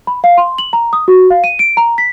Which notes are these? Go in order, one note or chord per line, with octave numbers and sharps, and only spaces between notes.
B5
F5
C6
F#7
A#5
D#6
F#4
F5
D#7
D7
A#5
B6